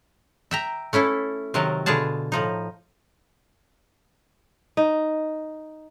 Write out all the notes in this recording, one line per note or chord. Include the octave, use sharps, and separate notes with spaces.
E5 G5 A#5
A3 C#4 E4 A4
C3 D#3 F#3 A#4 D#5 A5
B2 D3 F4 G#4 A5
A2 F3 D#4
D#4